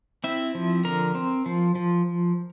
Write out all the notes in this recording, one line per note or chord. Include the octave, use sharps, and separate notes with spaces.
C4 E4 E5
F3
D3 A#4 A#5
C4
F3
F3